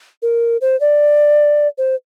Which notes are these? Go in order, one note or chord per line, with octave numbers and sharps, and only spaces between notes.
A#4
C5
D5
C5